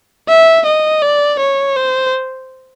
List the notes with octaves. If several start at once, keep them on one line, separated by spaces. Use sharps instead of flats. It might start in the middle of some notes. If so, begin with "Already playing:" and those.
E5
D#5
D5
C#5
C5